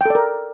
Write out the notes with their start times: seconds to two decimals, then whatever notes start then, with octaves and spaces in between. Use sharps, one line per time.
0.01 G5
0.06 A4
0.10 D5
0.15 A#4